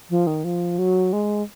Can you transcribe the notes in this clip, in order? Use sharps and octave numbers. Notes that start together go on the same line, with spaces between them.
F3
D#3
F3
F#3
G#3